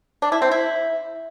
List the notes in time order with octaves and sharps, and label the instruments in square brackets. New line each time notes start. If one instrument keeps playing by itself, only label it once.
[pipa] D4
E4
C4
E4